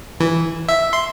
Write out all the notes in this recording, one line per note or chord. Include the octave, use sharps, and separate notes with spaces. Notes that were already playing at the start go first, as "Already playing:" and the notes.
E3
E5
C6